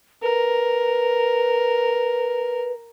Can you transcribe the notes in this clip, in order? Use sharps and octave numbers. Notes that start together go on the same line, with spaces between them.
A#4 B4